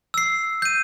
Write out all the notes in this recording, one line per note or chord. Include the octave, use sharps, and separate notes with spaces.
E6 C7
G6 D#7